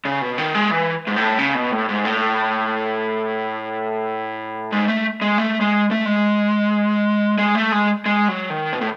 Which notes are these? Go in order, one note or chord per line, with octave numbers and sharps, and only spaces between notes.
C#3
B2
D#3
G#3
E3
G#2
A2
C#3
B2
A2
G#2
A2
G#3
A3
G#3
A3
G#3
A3
G#3
G#3
A3
G#3
G#3
F#3
D#3
B2
A2